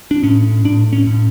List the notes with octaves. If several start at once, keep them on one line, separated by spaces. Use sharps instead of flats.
D4
A2 C#4
A2 D4
C#4
A2